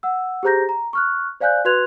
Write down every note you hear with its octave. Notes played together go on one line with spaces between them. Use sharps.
F#5 E6
G4 G#4 C5 A#5 G6 A#6
A#5
C#6 F6 F#6
C5 D5 F5 G#5 F#6 G6
F#4 B4 C6 F#6 G#6 F7